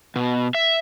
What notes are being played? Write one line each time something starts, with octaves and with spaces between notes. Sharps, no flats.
B2
E5